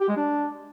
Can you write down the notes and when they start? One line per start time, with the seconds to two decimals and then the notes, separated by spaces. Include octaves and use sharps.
0.01 G4
0.09 G#3
0.17 D4